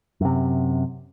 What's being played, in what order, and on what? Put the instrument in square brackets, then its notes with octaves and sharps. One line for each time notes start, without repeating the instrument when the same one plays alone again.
[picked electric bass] F#2 C3